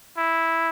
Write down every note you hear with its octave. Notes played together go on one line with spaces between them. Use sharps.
E4